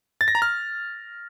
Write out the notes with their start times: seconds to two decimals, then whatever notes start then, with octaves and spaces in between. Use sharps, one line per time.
0.21 A6
0.28 A#6
0.35 A#5
0.42 F6